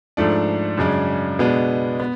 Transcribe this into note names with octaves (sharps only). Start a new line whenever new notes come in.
G#2 F3 A3 D4
F#2 C#3 G#3 D4
B2 G#3 B3 D4
B3